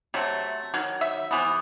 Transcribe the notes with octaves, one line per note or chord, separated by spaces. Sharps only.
C3 F#3 A3
D#3 F#3
E5
C3 E3 B3